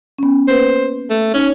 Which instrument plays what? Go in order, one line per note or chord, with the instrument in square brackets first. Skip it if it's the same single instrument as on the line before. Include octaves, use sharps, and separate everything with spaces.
[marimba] B3 C#4
[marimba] A#3 B4 [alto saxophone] C5
[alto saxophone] A3
[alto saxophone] C#4 [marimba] D#4 C#5